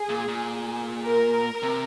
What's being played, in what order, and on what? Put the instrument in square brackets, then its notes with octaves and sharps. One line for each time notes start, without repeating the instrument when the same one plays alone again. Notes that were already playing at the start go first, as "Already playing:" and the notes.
Already playing: [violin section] G#4
[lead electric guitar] A#2
A#2
[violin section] A#4
[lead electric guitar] C3